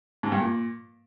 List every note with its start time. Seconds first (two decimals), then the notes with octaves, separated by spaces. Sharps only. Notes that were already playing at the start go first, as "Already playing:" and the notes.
0.23 G#2
0.32 G2
0.40 A#2